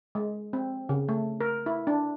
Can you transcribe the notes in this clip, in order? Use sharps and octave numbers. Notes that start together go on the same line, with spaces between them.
G#3
C4
C#3
A3
A#4
E4
D4